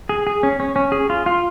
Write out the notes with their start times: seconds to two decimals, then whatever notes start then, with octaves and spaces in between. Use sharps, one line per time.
0.09 G#4
0.27 G#4
0.43 C#4
0.60 C#4
0.76 C#4
0.92 G#4
1.10 F4
1.26 F4